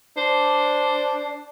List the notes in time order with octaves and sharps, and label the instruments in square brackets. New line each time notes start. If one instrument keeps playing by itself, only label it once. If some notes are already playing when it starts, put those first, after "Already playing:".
[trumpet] D4 [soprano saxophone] C5